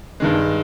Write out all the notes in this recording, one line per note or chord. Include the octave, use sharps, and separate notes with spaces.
G2 D#3 G#3